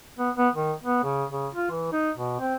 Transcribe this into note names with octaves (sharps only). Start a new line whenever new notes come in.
B3
B3
D#3
B3
C#3
C#3
F4
E3
D#4
B2
C4